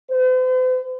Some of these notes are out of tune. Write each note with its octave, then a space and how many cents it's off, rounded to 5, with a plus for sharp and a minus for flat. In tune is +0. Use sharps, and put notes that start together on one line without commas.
C5 -45